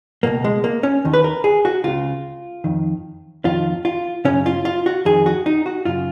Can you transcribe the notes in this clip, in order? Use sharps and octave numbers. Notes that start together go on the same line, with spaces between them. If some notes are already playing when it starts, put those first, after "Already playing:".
C#2 B2 A#3
G#3
A#3
C#4
D#2 D#3
B4
A#4
G#4
F#4
C#2 C#3 F4
F2 D#3
F2 D#3 F4
F4
F#2 C#3 C#4
F4
F4
F#4
F2 D#3 G#4
F#4
D#4
F#4
F#2 C#3 F4